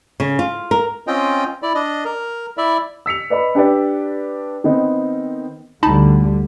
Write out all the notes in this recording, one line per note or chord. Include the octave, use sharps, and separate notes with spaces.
C#3
F4
A#4
C4 C#4 F4 D#5 G5
E4 D5
D4 D#5
A#4
E4 D5 E5
E6 B6 C#7 F7
B4 D5 D#5 B5
D4 G4 B4 D5
D#3 B3 C4 D#4
D2 D3 G3 D#4 A5 B5